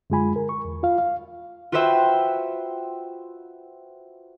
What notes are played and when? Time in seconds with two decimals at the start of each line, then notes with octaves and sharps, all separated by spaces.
0.10 F#2 D3 G#3 F4 G#5 B5
0.36 A#4
0.49 C#6
0.64 E2
0.83 F4 F5
0.98 F5
1.72 F4 F#4 B4 C5 E5 G5